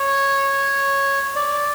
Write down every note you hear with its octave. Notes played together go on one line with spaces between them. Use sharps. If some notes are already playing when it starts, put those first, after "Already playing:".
Already playing: C#5
D5